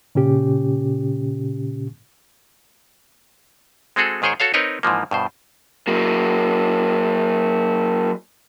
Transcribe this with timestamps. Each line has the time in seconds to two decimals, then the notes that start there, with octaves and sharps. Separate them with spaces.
0.15 A#2 C#3 C#4 G4
3.96 G#3 C4 F#4 G#4 A4
4.22 G#2 D#3 G#4 C5 C#5 G5
4.40 F#4 A4 C#5 F5
4.54 C4 D#4 A#4 B4 C#5 D#5
4.83 G#2 E3 F3 A#3
5.11 G2 B2 C5
5.88 F#3 A#3